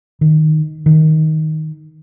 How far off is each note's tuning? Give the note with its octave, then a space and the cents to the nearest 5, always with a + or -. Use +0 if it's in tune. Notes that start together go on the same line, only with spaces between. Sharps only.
D#3 -5
D#3 +10